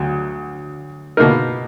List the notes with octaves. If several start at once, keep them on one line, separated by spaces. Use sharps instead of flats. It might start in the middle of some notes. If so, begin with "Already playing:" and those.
Already playing: D2 F#3
B2 A#3 D#4 A#4